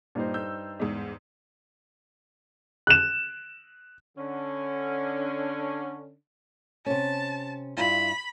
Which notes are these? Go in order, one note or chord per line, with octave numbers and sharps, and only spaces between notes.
G2 A#2 D#4 C5
E6 G6
E2 G#2
F#6 E7
D3 C#4
C3 C#4 A5
G2 E4 F4 B5